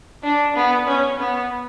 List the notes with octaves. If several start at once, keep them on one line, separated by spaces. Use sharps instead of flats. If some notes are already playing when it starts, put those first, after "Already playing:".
D4
B3
C#4
B3